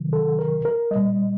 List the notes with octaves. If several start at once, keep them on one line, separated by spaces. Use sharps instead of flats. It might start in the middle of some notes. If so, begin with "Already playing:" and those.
Already playing: C3 D#3 F#3
A4
A#4
A#4
A#2 G3 D#5